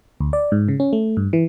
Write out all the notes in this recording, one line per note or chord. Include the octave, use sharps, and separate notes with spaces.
D2
D5
G#2
C#3
C#4
A3
G2
E3